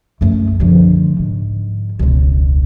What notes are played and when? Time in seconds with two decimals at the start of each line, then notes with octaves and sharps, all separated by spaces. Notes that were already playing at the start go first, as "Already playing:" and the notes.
0.21 F#2 A3
0.60 D3 F3
1.19 G#2
1.99 E1 C#2